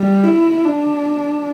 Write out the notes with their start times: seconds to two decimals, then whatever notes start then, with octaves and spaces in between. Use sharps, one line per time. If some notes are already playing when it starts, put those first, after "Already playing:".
Already playing: G3
0.24 E4
0.64 D4